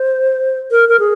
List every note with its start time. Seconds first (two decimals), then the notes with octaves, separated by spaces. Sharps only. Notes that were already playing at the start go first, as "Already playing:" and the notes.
Already playing: C5
0.71 A#4
0.89 A#4
0.99 G#4